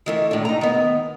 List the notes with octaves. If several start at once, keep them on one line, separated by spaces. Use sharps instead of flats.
D#3 E3 A3
A2 D4
D#4 A#5
D#3 B3